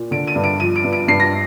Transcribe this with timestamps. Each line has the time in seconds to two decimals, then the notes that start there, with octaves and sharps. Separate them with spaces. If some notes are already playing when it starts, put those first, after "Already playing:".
Already playing: A#2
0.11 D3 D7
0.27 D#7
0.35 G2
0.44 D7
0.60 F3 D#7
0.76 D7
0.84 G2
0.93 D7
1.08 G2 C7
1.20 A#6